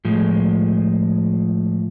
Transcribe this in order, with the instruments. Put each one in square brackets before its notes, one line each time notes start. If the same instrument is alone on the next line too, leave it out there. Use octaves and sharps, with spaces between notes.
[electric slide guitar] A2 F3 G#3